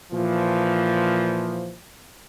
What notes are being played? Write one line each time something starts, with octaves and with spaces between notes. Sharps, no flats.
A#2 E3 F3